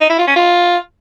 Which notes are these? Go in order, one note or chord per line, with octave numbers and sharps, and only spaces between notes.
D#4
E4
F4
C#4
F4